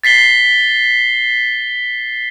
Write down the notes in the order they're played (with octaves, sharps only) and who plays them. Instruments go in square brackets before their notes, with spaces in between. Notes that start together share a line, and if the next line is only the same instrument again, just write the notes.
[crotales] A6 B6 C7 G7